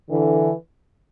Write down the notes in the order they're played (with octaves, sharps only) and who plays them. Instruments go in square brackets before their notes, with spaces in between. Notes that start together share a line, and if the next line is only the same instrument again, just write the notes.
[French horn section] D3 E3